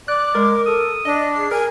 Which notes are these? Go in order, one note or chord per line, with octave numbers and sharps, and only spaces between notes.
D5 D6 F#6
G#3 A#4
A4 D#6
D4 D#5
G#4 C7
A#4 G#5